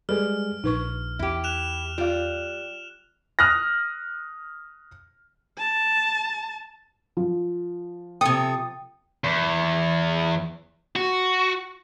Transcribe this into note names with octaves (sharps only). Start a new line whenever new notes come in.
G3 G#3 G#4 A4 B4 F6
A#1 D#4 B4 C#6
E2 E4 G4
F#6 E7 F7
G3 F4 D5 F5
D#6 F6 F#6 A#6
A5
F3
C3 A4 G5 D#6
E2
F#4